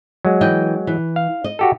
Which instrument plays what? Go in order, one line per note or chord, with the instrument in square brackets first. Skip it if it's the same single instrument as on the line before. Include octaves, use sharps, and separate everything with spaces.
[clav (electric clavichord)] F#3 G#3
[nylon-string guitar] E3 D#5 G5
E3
[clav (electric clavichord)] F5
[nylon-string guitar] D#5
[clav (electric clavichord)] F#4 G4 A4